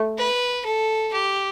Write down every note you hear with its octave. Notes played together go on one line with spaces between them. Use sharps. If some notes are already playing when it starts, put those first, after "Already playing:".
Already playing: A3
B4
A4
G4